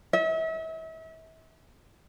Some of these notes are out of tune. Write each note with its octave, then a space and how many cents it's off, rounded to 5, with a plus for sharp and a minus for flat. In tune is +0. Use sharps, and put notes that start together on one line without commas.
E5 -40